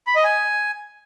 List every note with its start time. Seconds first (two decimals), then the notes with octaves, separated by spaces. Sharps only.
0.07 B5
0.16 D#5
0.24 G#5